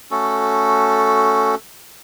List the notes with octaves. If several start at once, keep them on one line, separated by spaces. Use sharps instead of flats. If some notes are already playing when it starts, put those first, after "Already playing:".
A3 C#4 F#4 A4